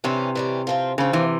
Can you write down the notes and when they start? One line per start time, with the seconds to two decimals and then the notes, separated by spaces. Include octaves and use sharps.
0.04 C3 E3 G3 C#4
0.35 E3 G3 C#4
0.67 F3 C4 F4
0.98 C#3 F3 C4 F4
1.13 C3 E3